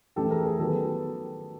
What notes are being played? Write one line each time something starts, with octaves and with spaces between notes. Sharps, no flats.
E3 A3 C#4 G4 A4
G#4 A#4
G#4 A#4
D#3 F#3 B3 G4 A4